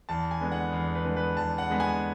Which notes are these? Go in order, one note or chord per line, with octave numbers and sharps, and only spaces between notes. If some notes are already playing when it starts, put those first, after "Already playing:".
E2 A5
G#5
D3 G#3 B3
F#5
E2
B4
D3 G#3 B3
B4
E2 A5
F#5
D3 G#3 B3
G#5